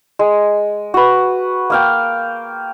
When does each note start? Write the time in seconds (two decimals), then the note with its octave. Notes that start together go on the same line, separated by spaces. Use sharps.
0.19 G#3
0.94 F#4 B4
1.70 A#3 F5 G5